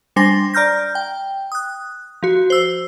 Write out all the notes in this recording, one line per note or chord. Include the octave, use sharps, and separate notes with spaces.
G3 D4 C5 G#5 C6 A#6
D5 A#5 F6 G6 A#6
G5
D#6 F#6
F3 F#4
C5 E6